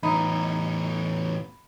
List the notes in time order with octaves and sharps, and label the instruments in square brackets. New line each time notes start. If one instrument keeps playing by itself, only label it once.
[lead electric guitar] E2 A2 [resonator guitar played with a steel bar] D#4 [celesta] B5